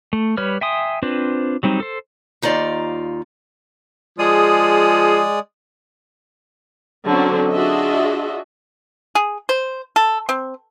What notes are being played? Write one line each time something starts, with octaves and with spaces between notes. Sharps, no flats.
A3
G3 B4 C#5 F6
E5 G5 G#5 C6 D#6
C4 D4 F4 B4 C5
F#3 G3 C4 D#4
A4 C5
D#2 D#4 F4 D5 A#5
F3 G#3 G#4 D5 D#6
D3 F#3 C4 C#4
D4 F4 F#4 G#4 D#5 E5
G#4
C5
A4
C4